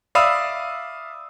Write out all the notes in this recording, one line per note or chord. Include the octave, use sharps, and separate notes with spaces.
D5 E5 F5 B5 D#6 E6